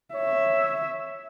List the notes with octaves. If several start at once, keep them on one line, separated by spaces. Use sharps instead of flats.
C#5 E5